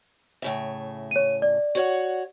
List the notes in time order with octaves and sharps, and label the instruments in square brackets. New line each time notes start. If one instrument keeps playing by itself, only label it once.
[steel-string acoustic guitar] A2 C#3 E5
[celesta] C#5 D#7
D5
[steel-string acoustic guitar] F#4 C#5 F#5